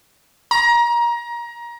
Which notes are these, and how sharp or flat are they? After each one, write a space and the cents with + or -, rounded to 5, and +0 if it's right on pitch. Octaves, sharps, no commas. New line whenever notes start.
A#5 +25